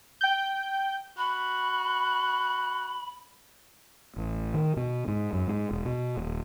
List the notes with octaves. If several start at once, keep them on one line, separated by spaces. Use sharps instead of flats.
G5 G6
F#4 B5
A1
D#3
B2
G#2
F#2
G#2
E1
B2
D#1